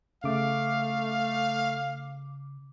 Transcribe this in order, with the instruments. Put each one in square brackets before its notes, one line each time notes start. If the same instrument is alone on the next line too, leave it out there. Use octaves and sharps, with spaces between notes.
[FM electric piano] C#3 D6 [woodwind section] A3 [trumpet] F5